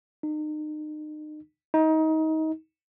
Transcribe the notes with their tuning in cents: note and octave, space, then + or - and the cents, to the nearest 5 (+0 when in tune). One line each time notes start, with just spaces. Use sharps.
D#4 -35
D#4 +25